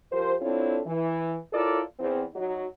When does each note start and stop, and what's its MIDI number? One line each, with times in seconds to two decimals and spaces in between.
0.12 0.34 53
0.12 0.34 67
0.12 0.34 70
0.12 0.34 72
0.41 0.80 60
0.41 0.80 62
0.41 0.80 64
0.41 0.80 65
0.41 0.80 69
0.41 0.80 73
0.86 1.36 52
1.54 1.81 64
1.54 1.81 65
1.54 1.81 69
1.54 1.81 70
1.54 1.81 73
1.54 1.81 74
1.99 2.22 40
1.99 2.22 60
2.34 2.64 54
2.34 2.64 63
2.34 2.64 66